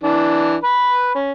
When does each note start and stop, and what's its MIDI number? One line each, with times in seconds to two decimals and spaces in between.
0.03 0.56 52
0.03 0.56 62
0.64 1.14 71
0.64 1.14 83
1.15 1.32 61